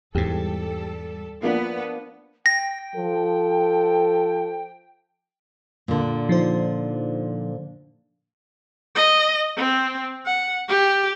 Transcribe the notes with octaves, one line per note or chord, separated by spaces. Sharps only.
E2 G#2 G3 G4 A4
F3 A#3 B3 D4 B4
G5 A#6
F3 A4
A#2 D3
F3 D#4 C5
D#5
C4
F#5
G4